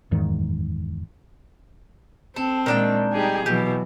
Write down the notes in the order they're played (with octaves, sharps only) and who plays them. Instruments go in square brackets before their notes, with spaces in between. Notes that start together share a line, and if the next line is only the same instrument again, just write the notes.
[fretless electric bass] F#1 E2 G#2 D#3
[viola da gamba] C4 [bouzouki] A4
[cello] A#2 G#3 [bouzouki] D#3 D4 G5
[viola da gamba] G3 D#4 [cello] G4 G#4
[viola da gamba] B2 E3 [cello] F#3 [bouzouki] G4